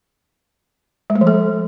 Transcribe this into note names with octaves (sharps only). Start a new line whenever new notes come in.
G#3
A3
F3
A4